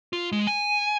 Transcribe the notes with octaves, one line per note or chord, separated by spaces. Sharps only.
F4
G#3
G#5